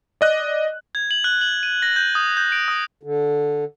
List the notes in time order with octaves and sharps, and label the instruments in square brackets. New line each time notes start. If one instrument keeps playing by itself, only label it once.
[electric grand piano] D5 D#5 F#6
[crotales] G#6
F#7
F#6
F#7
D#7
A#6
G6
D#6
G6
D7
D#6
[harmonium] D3